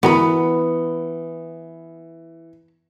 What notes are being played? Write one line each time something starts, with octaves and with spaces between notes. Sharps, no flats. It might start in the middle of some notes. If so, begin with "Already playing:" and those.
E3 B3 F#4 A#4 B5